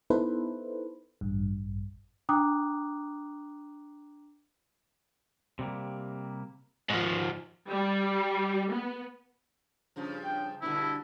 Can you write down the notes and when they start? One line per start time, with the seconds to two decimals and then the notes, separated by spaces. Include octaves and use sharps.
0.10 B3 D#4 E4 A4 B4 C5
1.21 A1 G2
2.29 D4 G5 A#5 D6 D#6 F#6
5.59 C3 G3 A#3
6.90 G#2 D#3 F3 F4 F#4
7.68 G3
8.71 B3
9.96 G2 C#3 F3
10.24 G5
10.62 G2 B2 D3 E4